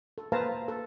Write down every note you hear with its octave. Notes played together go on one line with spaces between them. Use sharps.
A4
A#3 B4 C5 F5 A5 A#5
A4